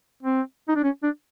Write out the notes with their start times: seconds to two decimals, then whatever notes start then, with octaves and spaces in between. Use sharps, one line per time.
0.23 C4
0.68 D#4
0.75 D4
0.83 C#4
1.03 D4